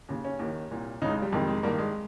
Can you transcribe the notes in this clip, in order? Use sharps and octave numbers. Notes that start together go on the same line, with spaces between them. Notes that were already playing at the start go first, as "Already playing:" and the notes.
D#2 C#3
C#4
D#2 D#3
C2 A#2
C#2 C#3 D#4
G#3
G3
F2 C3 D#3 G#3
G#3
G2 D#3 A#3
G#3